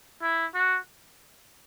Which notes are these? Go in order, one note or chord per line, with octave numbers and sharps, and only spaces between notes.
E4
F#4